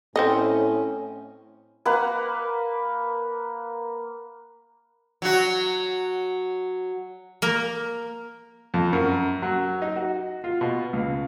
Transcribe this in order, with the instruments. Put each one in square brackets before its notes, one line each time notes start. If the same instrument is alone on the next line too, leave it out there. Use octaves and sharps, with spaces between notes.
[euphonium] A2 [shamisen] C4 A4 D#5 [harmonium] C#4
[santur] A#3 B4 F#5
[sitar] F#3 F#4
[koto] A#3 A#4
[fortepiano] F2
F#2
F#3
D#4
F#4
F4
B2
C#2